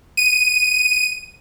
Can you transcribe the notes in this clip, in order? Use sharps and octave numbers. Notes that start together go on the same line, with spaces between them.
D#7